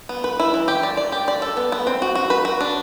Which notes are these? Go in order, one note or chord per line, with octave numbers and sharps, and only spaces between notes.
B3
B4
E4
E3
G4
D5
D5
G4
D5
A4
B3
B3
C4
F#4
F#4
B4
F#4
D4